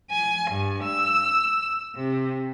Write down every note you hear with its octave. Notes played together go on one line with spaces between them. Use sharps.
G#5
G2
E6
C3